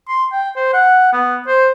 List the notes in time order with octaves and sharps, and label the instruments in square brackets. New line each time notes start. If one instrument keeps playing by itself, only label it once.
[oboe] C6
G5
C5
F#5
B3
C5